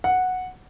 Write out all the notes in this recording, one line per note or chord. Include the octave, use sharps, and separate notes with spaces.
F#5